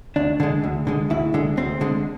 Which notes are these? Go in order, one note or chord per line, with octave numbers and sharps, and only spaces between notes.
D2 D4
D3 G#3
D2
D3 G#3
D2 E4
D3 G#3
D2 C4
D3 G#3